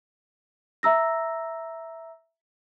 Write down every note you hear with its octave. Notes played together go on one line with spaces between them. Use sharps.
E5 A#5 E6 A#6